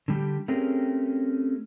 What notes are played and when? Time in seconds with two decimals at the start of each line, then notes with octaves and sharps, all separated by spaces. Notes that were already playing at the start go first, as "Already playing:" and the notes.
0.08 D3 G3 G4
0.48 A3 C4 C#4 G4 G#4 A#4